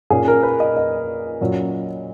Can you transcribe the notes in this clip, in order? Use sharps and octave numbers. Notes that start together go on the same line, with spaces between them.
A#2 A#3 C#4 G#4
A#4
B4
D#5
D#5
A#2 F#3 C#4